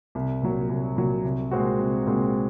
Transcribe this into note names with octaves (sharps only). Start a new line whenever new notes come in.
C2
A#2 F#3
C2
A#2 F#3
C2
A#2 G#3 C4 F#4
C2
A#2 G#3 C4 F#4